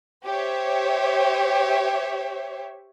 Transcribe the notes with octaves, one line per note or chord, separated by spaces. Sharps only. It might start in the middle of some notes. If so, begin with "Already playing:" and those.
G4 C5 C#5 E5